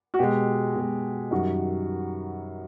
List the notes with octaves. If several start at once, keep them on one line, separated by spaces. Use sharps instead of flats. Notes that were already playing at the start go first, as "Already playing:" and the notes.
F#4
B2 G#3 G4
B2 G#3
F#2 D#3 G3 F#4